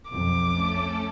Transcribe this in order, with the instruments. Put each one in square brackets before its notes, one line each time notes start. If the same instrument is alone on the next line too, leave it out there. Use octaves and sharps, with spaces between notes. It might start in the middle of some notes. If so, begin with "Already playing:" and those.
[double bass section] B1 F2 [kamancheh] D6
[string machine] A3 C#4 A4